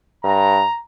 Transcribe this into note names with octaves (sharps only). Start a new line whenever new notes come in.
G2 A#5